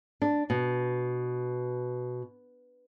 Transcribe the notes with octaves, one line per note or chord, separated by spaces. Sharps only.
D4
B2